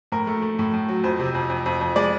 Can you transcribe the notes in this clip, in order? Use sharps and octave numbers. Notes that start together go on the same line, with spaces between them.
A2 A#4
A3
A3
A2
A2
F#3
F2 C5
C3
F2
F2
F2
F2
G#3 D5